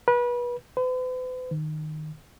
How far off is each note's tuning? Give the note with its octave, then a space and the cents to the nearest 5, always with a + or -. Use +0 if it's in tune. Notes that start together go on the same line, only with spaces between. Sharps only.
B4 -30
B4 +45
D#3 -15